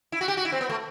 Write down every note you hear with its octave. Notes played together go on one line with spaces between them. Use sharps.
E4
F#4
G4
F#4
E4
C4
B3
A3